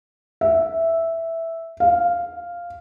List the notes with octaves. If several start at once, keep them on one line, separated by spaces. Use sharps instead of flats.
E5
F5